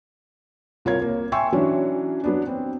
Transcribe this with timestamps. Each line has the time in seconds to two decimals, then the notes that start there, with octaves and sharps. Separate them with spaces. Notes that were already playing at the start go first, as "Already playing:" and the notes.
0.85 C2 F4 A#4 C#5 G#6
1.02 A#3
1.32 E5 G5 G#5 C6 C#6 E6
1.52 E3 F#3 C#4 D4
2.24 F#3 B3 D4
2.47 C4